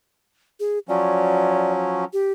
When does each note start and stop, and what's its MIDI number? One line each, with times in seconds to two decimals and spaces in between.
0.60 0.79 68
0.89 2.05 53
0.89 2.05 54
0.89 2.05 61
0.89 1.73 74
2.13 2.33 67